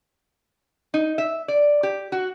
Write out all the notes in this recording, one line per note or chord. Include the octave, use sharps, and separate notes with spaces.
D#4
E5
D5
G4
F#4